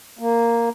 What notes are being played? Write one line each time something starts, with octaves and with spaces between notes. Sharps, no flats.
A#3